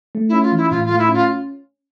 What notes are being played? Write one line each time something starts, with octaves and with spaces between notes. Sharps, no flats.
A3
C#4 E4
F4
E3 E4
A2 F4
A3 F4
E4
C#4 F4